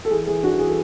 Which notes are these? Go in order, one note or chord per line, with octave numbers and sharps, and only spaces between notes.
A4
E3 G#4
E3 G#4
D4 F#4
E3 G#4
A4